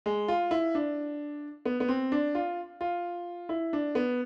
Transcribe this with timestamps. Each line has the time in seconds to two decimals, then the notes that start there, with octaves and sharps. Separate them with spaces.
0.06 G#3
0.28 F4
0.51 E4
0.75 D4
1.65 B3
1.80 B3
1.88 C4
2.12 D4
2.35 F4
2.81 F4
3.49 E4
3.73 D4
3.95 B3